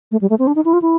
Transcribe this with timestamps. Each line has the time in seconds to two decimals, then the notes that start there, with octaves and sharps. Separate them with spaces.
0.11 A3
0.21 G3
0.30 A3
0.39 C4
0.47 D4
0.55 D#4
0.65 E4
0.73 F4
0.82 E4